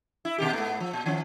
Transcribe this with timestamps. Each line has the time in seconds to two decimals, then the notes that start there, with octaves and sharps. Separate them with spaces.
0.25 E4
0.38 B2 D#3 G4
0.53 G#2 A3 B3
0.80 F3
0.93 A#2
1.06 D#3 F3 C#4